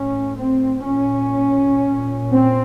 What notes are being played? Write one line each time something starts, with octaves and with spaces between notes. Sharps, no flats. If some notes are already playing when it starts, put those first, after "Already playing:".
Already playing: A2 C#4
C4
A#2 C#4
A#2
C4